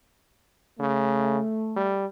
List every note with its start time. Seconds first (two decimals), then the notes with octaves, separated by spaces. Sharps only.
0.80 C#3 A3
1.76 G3